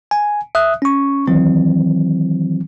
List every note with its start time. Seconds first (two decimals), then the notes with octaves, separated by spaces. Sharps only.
0.11 G#5
0.55 E5 D#6 F#6
0.82 C#4 C#6
1.27 D#3 E3 F#3 C4